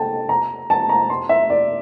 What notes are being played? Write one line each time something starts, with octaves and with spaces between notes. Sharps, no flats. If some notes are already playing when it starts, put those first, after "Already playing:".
Already playing: A4 G5 A5
A#5
A5
A#5
C6
E5
D5